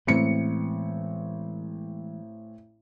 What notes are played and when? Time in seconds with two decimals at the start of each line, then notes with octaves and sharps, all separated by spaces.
0.07 A1 E3 G#3 B3 C4 C#7